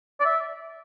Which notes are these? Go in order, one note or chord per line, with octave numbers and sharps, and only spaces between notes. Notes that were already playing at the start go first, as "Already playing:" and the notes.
D5
E5